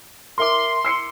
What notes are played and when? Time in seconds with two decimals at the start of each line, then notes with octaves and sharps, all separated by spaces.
0.38 A#4 E5 C6 D6
0.85 E6 C7 C#7